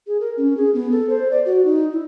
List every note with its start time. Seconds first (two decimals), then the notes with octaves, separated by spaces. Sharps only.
0.07 G#4
0.21 A#4
0.37 C#4
0.57 G#4
0.74 B3
0.91 A4
1.09 C5
1.31 D5
1.46 F#4
1.65 D#4
1.93 E4